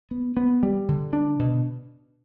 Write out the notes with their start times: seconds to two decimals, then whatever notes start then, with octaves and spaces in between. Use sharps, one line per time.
0.11 B3
0.37 B3
0.63 G3
0.88 D3
1.13 D4
1.39 B2